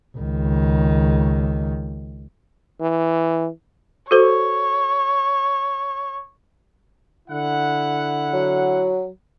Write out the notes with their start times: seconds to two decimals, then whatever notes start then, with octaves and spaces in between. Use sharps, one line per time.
0.17 C#2 D#3
2.81 E3
4.11 F#4 A4 C5 C#5
7.29 D3 E4 F#5
8.34 F#3